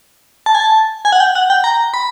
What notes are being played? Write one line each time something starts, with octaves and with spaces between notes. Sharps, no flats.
A5
G#5
A5
G#5
F#5
G5
F#5
G5
A#5
B5